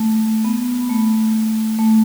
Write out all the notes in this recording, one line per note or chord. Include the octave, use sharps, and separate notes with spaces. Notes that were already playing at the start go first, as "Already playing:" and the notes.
Already playing: A3
B3
A3
A3